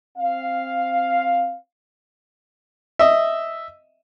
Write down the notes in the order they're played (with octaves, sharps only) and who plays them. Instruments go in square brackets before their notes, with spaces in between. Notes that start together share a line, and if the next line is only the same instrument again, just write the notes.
[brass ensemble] C4 F5
[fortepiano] D#5 E5